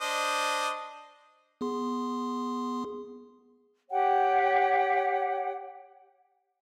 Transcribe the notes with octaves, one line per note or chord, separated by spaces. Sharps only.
D4 C5 D#5
B3 G#4 C6
G4 C#5 F#5 G5